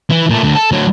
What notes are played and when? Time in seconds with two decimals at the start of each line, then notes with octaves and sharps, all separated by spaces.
0.10 E3
0.30 A#2 A3
0.43 D2
0.55 A4
0.72 D2 F#3